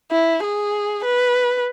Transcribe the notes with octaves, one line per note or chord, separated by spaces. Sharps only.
E4
G#4
B4